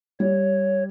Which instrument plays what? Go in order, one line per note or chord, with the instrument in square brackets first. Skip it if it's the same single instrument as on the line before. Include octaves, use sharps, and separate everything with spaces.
[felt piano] G3 [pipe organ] C#5